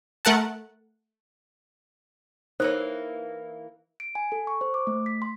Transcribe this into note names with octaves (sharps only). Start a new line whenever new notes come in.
A3 A#4 F#5 A5
E3 A#3 D#4 C5 C#5
D7
G#5
A4
C#6
C5
D6
A3
B6
C6